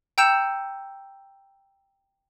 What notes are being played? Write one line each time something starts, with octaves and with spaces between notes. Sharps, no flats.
G5 A#5 E6 G6 C#7 E7